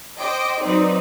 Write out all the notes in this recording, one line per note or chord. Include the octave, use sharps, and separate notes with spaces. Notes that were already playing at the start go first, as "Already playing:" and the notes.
C5 D#5 G5 D6
F#3 C4 D#4 B4 C5 D5